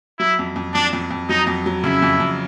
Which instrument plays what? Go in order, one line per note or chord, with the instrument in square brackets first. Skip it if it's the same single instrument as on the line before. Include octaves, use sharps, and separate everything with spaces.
[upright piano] F#3 [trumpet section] E4
[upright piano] F2
F2
[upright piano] F2 [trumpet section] D4
[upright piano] F2
F2
[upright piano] F#3 [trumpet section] D#4
[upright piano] F2
F#3
[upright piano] C#3 [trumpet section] E4
[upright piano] F2
F2